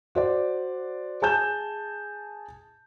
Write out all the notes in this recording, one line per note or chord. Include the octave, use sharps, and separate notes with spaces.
F#4 C5 D5
G#4 G#5 A5 G6 E7